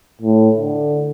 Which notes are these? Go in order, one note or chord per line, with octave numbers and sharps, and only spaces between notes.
A2
D3